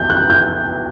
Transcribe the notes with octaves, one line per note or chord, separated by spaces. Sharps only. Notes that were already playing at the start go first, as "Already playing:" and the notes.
Already playing: B1 G6
F#6
G6